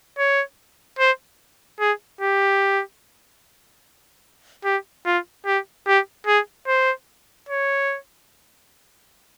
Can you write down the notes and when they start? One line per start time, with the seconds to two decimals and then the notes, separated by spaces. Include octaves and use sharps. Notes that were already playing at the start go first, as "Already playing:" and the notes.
0.18 C#5
0.99 C5
1.80 G#4
2.21 G4
4.64 G4
5.06 F4
5.46 G4
5.87 G4
6.27 G#4
6.67 C5
7.49 C#5